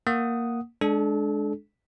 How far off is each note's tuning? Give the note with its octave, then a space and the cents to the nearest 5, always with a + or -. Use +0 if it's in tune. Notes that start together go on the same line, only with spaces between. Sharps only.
A#3 +0 F#5 +0 D#6 +0
G#3 +10 D4 +0 A4 -35